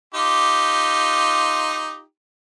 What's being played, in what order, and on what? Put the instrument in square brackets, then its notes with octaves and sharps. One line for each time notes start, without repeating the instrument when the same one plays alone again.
[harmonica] D#4 F4 G4